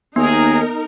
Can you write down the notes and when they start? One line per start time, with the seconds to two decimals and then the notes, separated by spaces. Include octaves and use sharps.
0.16 D#2 B3 D#4 G#4 A#4